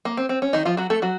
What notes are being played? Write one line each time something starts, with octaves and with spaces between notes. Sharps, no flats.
A#3
C4
C4
C#4
D#3 D#4
F3 F4
F#3 F#4
A3 A4
F#3 F#4